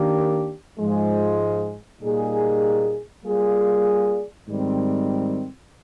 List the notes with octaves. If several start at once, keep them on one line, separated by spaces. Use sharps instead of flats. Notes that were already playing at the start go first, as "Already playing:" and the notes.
Already playing: D#3 A#3 D4 G4
G#2 F3 G#3
A#2 G3 A#3 D#4 G#4
G3 A#3 F4 G#4 D5
G#2 D#3 G3 C4